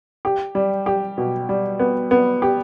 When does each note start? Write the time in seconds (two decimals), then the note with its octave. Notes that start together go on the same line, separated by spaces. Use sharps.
0.25 G4
0.55 G3
0.86 G4
1.18 B2
1.49 G3
1.80 B3
2.11 B3
2.42 G4